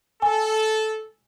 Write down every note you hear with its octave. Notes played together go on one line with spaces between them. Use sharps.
A4 G#5